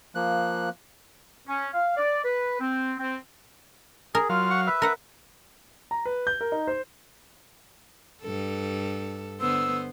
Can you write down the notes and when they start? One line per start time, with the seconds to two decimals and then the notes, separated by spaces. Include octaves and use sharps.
0.15 F3 A#3 F#6
1.47 C#4
1.73 F5
1.96 D5
2.24 B4
2.60 C4
2.99 C4
4.15 G#4 A#4
4.30 F#3 F4 F5
4.50 F#5 C#6
4.67 B4 E5
4.82 A#4 F#5
5.91 A#5
6.06 B4
6.27 G6
6.41 A#4
6.52 D#4
6.67 C5
8.22 G2 A4
9.41 D3 B3 C5 E6